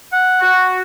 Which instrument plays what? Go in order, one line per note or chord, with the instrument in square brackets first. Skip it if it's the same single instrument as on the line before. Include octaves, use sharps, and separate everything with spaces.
[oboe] F#5
[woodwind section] F#4